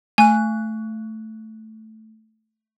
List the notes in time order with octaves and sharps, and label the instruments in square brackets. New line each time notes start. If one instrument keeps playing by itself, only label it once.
[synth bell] A3 F#6 [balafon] G#5